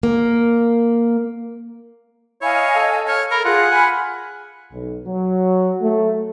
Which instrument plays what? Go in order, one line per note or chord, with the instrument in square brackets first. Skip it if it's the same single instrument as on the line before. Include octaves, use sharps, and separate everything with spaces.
[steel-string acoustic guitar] A#3
[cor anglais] E4 [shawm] C#5 [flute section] D#5 F5 G#5
[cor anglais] A4
[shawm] C#5 [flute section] F6
[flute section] A4 B5 [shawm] A#4
[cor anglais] F4 [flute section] G#4 [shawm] F#5
[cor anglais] G#5 [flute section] B5 F6
[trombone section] B1
F#3
A3